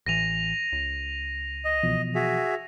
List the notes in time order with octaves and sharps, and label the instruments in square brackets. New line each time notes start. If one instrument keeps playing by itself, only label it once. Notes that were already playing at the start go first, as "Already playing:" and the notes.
[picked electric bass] A1 E3 [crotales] A#6 D#7 F7
[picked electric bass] C#2
[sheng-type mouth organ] D#5
[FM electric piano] B2 E3 F3
[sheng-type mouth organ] F#4 G#4 E5